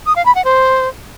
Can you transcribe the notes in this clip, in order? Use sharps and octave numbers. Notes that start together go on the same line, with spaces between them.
D#6
F5
B5
F#5
C5